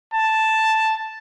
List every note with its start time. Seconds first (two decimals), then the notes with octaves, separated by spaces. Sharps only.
0.14 A5